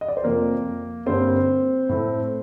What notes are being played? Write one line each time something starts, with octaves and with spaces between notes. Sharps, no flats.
D#5
D5
C5
F2 C3 F3 A#3 A#4
G2 D3 G3 A#3 C4 C5
A2 A3 C4